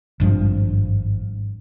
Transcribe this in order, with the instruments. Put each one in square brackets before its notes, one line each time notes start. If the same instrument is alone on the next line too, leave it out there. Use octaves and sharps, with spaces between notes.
[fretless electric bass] G#1 G2 F3